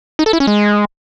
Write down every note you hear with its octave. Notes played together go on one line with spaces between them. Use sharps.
D#4
A4
E4
C#4
G#3